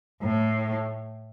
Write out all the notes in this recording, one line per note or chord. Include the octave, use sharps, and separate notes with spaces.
A2